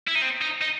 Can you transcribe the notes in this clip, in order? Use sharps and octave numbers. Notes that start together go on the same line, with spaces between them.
E4
D#4
C4
D#4
D#4